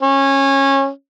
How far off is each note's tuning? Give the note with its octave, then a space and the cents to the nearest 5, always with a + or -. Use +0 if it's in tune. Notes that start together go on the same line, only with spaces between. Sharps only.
C#4 -20